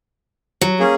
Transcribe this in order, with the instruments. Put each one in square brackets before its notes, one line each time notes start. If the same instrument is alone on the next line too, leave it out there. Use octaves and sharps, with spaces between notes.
[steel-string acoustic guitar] F#3
[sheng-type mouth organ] A#3 C#4 G#4